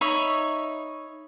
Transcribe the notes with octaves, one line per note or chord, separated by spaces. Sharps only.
D#4 C#5 E5 B5